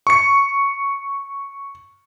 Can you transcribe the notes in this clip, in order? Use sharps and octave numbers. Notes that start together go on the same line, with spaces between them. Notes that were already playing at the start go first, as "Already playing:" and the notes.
C#6 C#7